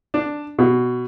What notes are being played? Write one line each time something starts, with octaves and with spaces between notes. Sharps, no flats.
D4
B2